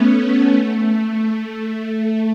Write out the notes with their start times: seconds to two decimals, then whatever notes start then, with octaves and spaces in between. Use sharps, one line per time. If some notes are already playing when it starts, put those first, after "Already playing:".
Already playing: A3 B3 C#4
0.17 A3
0.52 A3